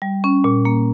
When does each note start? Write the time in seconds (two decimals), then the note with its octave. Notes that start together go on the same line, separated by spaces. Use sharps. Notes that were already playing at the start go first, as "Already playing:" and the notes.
0.02 G3
0.24 C#4
0.44 A#2
0.65 A#3